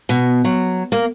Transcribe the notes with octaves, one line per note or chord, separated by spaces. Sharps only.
B2
F#3
A#3